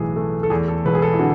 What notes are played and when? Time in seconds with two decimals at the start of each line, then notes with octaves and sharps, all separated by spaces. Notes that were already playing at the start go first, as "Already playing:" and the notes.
Already playing: B1 A2 E3 G#4
0.16 A3
0.43 A4
0.50 E2 G#4
0.68 A4
0.85 E1 B4
0.95 G#4
1.02 A4
1.13 E4
1.19 D3 F#4